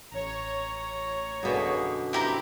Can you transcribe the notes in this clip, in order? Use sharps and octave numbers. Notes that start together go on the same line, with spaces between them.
A1 C#5 A#5
F#2 B2 D3 A#3 G#4
G2 C4 E4 G4 E5 A#5